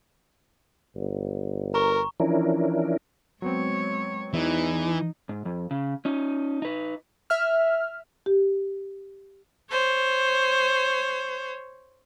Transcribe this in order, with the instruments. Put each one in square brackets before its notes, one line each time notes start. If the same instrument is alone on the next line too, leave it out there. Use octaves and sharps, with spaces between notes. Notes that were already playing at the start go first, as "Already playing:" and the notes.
[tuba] G1
[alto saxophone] A#4 [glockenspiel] A#5 C#6
[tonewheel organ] E3 F3 C#4 D4 E4 A#4
[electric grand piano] F#3 B3 C4 [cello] G#3 C#5
[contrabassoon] E2 [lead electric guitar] E3 [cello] D#4
[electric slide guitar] G#2
F2
C#3
C#4 D#4
D#4 B4
[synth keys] E5 F6
[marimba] G4
[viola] C5 C#5